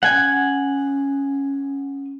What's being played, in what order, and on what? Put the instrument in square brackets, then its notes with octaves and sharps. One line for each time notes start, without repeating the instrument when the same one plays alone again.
[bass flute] C#4 [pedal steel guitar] F#5 G#5